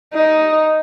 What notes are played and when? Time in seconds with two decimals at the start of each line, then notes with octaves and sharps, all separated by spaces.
0.14 D#4